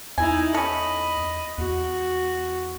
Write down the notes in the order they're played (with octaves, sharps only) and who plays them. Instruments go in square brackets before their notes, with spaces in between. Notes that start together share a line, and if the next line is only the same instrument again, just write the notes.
[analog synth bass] E2 [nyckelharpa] D#4 E4 [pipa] G#5
[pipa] C#4 A4 [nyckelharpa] D#5 B5
[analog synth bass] E2 [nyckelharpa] F#4